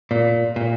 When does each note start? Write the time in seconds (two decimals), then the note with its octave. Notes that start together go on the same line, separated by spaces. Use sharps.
0.11 A#2
0.56 A#2